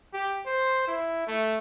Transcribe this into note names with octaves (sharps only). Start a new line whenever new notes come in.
G4
C5
E4
A3